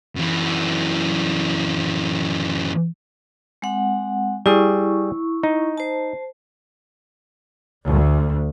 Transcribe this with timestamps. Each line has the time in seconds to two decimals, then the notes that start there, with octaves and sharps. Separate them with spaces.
0.16 F#2 E3
3.62 G#3 C4 F#5
4.46 G3 E4 G#4 C#6
5.43 D#4
5.78 C5 A5
7.87 D2